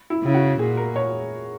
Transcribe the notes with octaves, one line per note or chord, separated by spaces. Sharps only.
E4
C#3 E4
F#4
A#2 G#4
A#4
C#5